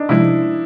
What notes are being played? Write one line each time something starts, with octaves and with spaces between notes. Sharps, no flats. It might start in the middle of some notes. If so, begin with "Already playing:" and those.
Already playing: D4 D#4
C3 F3 G#3 E4